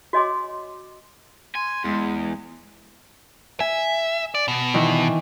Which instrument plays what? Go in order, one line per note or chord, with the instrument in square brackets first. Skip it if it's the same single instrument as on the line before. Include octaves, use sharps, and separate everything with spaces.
[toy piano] F#4 C#5 D#5 G#5 C6 D6
[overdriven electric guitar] G#5 [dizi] C6
[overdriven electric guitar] E2 [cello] G#3
[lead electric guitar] E5 [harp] G#5
[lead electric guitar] D5
B2
[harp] D#3 E3